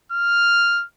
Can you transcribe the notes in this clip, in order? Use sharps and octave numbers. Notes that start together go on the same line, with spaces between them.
F6